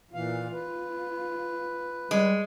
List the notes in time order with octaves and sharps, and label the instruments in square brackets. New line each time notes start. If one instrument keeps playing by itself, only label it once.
[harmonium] A#2 E3 F5 [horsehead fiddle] F4
[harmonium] B4
[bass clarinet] G3 [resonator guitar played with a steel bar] G#3